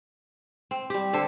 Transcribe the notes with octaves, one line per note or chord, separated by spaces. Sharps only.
C4
G3 G4
D3 A4 C5